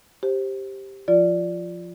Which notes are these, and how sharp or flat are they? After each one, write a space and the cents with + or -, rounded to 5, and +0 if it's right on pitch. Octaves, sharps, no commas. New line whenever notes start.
G4 +0 C5 +15
F3 +0 F4 -5 D5 +0